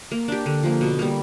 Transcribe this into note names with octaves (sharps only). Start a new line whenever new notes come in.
A#3
D4 G4
D3
F3 A#3
B2
G3 A#3